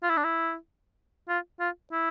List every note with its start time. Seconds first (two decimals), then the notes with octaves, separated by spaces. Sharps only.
0.03 F4
0.10 E4
0.17 D4
0.24 E4
1.29 F4
1.60 F4
1.92 E4